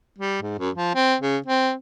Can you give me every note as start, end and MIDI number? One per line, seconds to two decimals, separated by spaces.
0.19 0.42 55
0.42 0.56 44
0.59 0.70 42
0.75 0.94 53
0.95 1.15 60
1.21 1.38 49
1.47 1.72 60